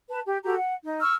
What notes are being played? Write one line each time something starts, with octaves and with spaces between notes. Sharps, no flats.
B4 A5
G4
F#4 G4 A4 A#5
F#5
D#4
C#6 E6 F6